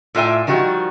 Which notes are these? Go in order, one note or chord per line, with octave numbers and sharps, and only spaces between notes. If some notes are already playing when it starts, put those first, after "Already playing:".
A2 F4 D5 E5 G#5
D#3 F3 G3 F#4